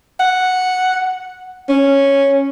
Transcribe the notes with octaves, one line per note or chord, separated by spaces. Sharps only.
F#5
C#4